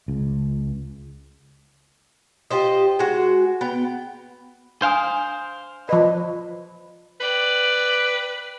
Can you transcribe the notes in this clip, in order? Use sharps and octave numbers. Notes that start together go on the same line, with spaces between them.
C#2
F4 G4 C5 D#5
G#3 F#4
B3 G5
D4 C5 F5 G#5 D#6
F3 B4 D5 D#5
B4 D5 G5